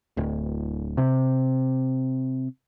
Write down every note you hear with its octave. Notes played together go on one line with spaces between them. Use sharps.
D1
C3